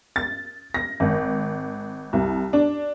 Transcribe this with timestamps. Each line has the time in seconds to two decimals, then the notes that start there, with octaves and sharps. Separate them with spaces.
0.16 A6
0.74 A#6
1.00 G#1
2.13 C2
2.53 D4